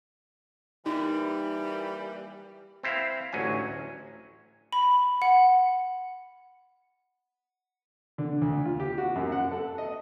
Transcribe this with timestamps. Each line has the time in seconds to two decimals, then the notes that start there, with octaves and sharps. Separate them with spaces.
0.86 E3 G3 A#3 D#4
2.83 C4 E4 C5 E5 F5
3.33 A1 D2 F#3 C#4 G#5
4.73 B5
5.22 F#5
8.18 D3
8.41 D2
8.65 F4
8.80 G4
8.98 F#4
9.16 F#2
9.32 F#5
9.52 A4
9.78 D#5